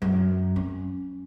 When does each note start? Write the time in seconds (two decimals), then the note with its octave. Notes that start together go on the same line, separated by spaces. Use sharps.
0.02 F#2
0.56 C#4